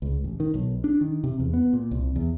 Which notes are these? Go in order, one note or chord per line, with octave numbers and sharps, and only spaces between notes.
C#2
A1
D#3
B1
D4
D#3
C3
E2
B3
A#2
C2
E2